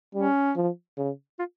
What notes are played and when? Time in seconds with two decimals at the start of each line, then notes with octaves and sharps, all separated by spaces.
0.15 G3 C#4
0.56 F3
0.98 C#3
1.39 F4